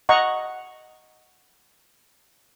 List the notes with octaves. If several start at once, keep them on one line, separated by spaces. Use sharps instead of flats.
D#5 F#5 A#5 C#6